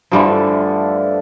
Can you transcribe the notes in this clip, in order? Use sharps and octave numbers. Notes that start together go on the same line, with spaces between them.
G2 D3 E3 F3 G3 A3